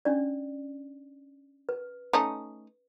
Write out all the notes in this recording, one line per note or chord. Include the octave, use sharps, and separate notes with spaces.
C#4 D4 D5
B4
A3 C#4 D#4